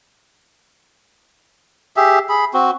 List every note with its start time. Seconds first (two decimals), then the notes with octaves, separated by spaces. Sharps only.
1.97 G4 G#4 E5
2.29 G#4 B5
2.54 C4 F#4